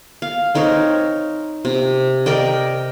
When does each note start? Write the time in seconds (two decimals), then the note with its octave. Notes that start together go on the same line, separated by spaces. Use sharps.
0.22 F5
0.55 C4 D#4 A#4 C#5
1.65 C3
2.26 A#4 D5 D#5 G5